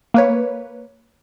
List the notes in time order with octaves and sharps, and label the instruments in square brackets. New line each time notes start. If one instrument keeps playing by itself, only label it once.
[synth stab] A#3 B4 C#5